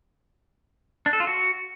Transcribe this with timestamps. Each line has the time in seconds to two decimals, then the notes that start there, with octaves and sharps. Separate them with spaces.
1.06 D4
1.13 A4
1.20 F4
1.27 F#4